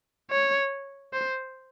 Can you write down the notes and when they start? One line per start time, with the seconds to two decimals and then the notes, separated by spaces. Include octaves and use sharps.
0.31 C#5
1.13 C5